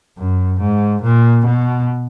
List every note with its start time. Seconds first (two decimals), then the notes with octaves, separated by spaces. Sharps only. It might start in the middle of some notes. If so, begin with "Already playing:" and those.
0.18 F#2
0.61 G#2
1.02 A#2
1.46 B2